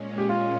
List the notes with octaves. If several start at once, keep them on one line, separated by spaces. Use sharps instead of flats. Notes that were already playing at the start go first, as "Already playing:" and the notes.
Already playing: A#2 G#3 C#4
G4
F4